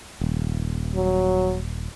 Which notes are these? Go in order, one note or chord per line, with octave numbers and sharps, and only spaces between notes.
D#1
F#3